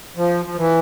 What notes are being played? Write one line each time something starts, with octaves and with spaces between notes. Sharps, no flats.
F3
F3
E3